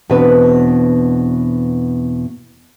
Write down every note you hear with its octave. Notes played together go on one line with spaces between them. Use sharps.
E2 B2 C4 D4 B4 A5